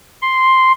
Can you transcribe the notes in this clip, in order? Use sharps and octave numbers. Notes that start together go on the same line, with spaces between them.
C6